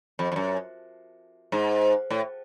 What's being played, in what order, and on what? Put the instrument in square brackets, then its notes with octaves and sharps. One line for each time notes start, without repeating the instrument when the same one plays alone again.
[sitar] F2
F2
F#2
G#2
A2